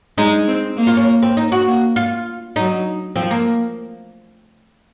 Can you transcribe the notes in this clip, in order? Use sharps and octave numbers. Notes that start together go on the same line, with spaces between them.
G#3 D#4
C4
A#3
F4
C#4
C4
D#4
F#4
A#3
F4
F#3 D#4
F3 C4
A#3